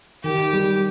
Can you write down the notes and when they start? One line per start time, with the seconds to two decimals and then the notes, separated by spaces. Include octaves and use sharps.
0.24 D#3 G4
0.53 G3